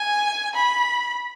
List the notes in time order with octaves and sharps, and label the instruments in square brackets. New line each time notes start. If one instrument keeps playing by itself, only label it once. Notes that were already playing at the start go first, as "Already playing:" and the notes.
Already playing: [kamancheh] G#5
B5